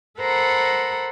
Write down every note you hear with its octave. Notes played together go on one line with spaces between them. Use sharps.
A4 A#4 C5 F#5 A#5 B5